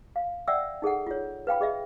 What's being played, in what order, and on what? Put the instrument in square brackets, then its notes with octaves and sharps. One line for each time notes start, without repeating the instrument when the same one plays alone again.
[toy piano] F5
D5 E5 F#5 G5 E6
D#4 G#4 A4 F#5
F4 C#5
B4 F5 G5 B5
G#4 D#5 E5